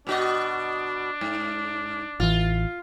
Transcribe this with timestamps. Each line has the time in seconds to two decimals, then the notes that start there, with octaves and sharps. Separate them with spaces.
0.07 B2 D4 F#4 D#5
1.21 G#2
2.20 A1 E3 F4